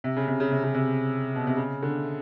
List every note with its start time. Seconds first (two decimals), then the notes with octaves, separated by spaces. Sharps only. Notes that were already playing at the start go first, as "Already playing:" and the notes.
0.04 C3
0.16 C#3
0.28 C3
0.40 C#3
0.52 C3
0.63 C#3
0.74 C3
1.35 B2
1.47 C3
1.57 C#3
1.82 D3